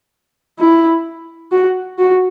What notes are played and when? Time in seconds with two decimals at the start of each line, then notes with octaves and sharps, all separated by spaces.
0.60 E4
1.52 F#4
1.99 F#4